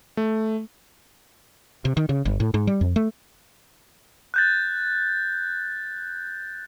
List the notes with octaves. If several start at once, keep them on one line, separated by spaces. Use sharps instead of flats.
A3
C3
D#3
C#3
G1
A2
G#2
G3
F2
A3
F#6 G6 A6